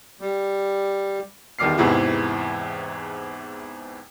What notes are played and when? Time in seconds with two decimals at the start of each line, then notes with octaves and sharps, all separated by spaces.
0.21 G3
1.59 E2 D#3 G3 D6 F6 C7
1.78 E2 G#2 C3 E3 E4